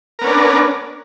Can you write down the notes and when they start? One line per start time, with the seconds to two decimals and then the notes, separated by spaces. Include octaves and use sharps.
0.19 A#4
0.22 B3
0.24 C#4
0.27 D4